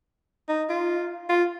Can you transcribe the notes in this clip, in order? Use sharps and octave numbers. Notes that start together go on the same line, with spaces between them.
D#4
F4
F4